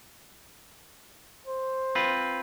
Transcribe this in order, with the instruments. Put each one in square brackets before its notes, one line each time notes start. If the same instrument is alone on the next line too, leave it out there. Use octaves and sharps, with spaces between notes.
[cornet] C5
[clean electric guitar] C4 F4 B4